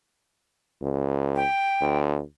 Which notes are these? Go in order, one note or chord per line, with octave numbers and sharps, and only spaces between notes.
C#2
G5
D2